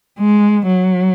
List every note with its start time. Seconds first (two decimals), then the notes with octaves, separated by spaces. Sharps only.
0.19 G#3
0.66 F#3